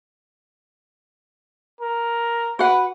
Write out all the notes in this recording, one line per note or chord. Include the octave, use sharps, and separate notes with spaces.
A#4
F#4 B4 F#5